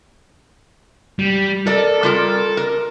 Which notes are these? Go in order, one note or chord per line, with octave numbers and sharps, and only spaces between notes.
G3
A4 A#4 D5
G3 F4 A#4
A#4